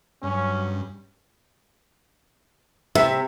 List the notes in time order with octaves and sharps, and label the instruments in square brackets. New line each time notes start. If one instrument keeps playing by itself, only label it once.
[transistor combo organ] G2 [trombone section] F#3 C#4
[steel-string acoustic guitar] C3 [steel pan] E5